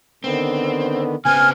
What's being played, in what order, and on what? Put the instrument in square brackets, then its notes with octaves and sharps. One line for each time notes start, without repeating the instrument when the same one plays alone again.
[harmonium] D3 D#3 B3 [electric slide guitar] C4
[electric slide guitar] C#3 B3 C4 [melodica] G#5 [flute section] F6